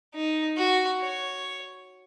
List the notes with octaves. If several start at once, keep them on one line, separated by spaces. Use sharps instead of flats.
D#4
F#4
C#5